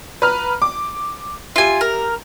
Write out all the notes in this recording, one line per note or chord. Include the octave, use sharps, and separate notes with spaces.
B4 A#5 F6
D6
F4 G4 E5 G#5
A#4